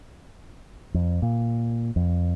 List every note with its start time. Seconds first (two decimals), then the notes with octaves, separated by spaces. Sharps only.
0.94 F2
1.22 A#2
1.96 F2